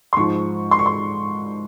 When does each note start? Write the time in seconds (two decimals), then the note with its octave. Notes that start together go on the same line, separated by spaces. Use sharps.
0.13 C6
0.17 G#2 F3 C#6
0.71 C6
0.79 C#6
0.86 C6